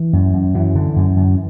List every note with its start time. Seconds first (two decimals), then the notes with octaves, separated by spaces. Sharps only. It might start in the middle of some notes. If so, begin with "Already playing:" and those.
Already playing: E3
0.13 F#2
0.34 F#2
0.54 F#2 E3
0.75 D3
0.96 F#2
1.17 F#2